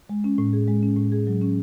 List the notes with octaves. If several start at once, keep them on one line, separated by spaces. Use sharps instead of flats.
G#3
C#4
A2
G#4
G#3
C#4
A2
G#4
F#3
C#4